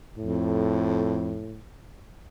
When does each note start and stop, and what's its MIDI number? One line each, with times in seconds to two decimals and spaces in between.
0.18 1.44 41
0.18 1.61 45